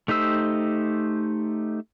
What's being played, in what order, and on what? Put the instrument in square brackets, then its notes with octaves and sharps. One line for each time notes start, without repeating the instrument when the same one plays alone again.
[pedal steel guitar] A3 D#4 G4 C5 E6